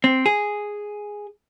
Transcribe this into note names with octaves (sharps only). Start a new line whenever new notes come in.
C4
G#4